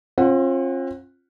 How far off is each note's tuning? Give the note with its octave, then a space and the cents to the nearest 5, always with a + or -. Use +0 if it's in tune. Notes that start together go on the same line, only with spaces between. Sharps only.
C4 +45 F4 +0 F#5 +0